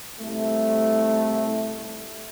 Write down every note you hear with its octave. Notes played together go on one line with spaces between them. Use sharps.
C2 A3